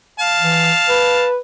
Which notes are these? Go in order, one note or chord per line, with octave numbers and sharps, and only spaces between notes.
F5 A5
E3
B4